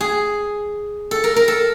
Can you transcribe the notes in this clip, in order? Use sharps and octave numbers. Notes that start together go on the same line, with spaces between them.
G#4
A4
A#4
A#4
A4